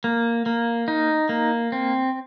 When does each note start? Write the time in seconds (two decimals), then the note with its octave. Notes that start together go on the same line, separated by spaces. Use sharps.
0.04 A#3
0.46 A#3
0.88 D#4
1.29 A#3
1.72 C4